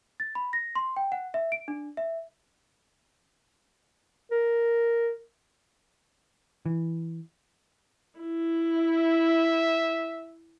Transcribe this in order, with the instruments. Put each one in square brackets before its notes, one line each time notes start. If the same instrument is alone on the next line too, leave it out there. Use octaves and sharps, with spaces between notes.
[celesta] A6
B5
A#6
C6
G5
F#5
E5
D7
D4
E5
[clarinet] A#4
[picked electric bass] E3
[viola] E4
[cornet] E5